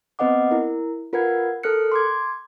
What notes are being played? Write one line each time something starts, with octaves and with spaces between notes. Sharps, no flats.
B3 C4 B4 D#5 F#5 D6
E4 A#4
F4 A#4 B4 F#5 G#6
A4 A#4 F6 F#6 C#7
C6 D6 G#6